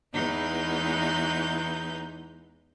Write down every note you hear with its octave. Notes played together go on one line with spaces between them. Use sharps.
E2 E3 G#3 D#4 G6